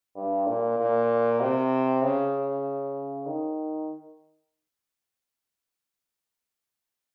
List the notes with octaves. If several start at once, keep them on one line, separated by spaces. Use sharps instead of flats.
G2
A#2
A#2
C3
C#3
D#3